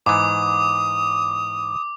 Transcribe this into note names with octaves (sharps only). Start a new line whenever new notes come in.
G#2 E3 D6 D#6